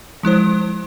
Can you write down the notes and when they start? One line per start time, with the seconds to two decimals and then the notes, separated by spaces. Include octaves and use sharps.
0.23 F3 G#3 E4 C5